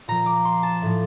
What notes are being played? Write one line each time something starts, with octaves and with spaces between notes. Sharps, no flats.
A#2 F3 A#5
D6
C6
A5
A2 F3